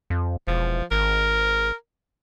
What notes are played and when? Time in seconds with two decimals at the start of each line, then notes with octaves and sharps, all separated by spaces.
0.10 F2
0.47 E1 F3
0.91 G#1 A#4